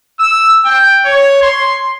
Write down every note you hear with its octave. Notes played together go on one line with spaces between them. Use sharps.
E6
G5
C#5
C6